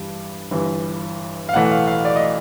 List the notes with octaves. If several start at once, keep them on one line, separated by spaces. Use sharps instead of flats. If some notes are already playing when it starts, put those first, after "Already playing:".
Already playing: G2 E3 G3
G1 G2 E3
F5
B1 A2 E3 A3 F#5
F#5
F5
F5
D5
D#5